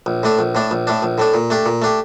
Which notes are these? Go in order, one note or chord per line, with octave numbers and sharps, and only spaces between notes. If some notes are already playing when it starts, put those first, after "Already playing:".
A#1
A2 A3 D4
A#1
A2 A3 D4
A#1
A2 A3 D4
A#1
A2 A3 D4
A#2
A3 D4 G4
A#2
A3 D4 G4